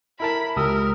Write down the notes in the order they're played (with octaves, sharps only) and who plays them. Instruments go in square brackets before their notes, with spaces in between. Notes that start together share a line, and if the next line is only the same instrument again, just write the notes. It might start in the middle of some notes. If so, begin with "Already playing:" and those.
[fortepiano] E4 A#4 A5 [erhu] B5
[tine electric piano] C#2 D#6 E6 [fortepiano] G4 [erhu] A#4